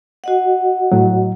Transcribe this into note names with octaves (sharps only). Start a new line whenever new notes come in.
F#4 D#5 F#5
A2 F#3